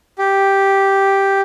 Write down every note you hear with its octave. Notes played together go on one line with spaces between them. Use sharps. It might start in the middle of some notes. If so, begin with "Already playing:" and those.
G4